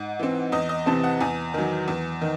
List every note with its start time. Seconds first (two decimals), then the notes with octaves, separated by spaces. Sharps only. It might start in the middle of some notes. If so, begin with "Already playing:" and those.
Already playing: G#2 F#5
0.19 E3 C4
0.52 E2 D#5
0.69 D#5
0.86 C3 E3 C4 A5
1.04 F#5
1.21 E2 G#5
1.54 D#3 F#3
1.88 E2
2.21 D#3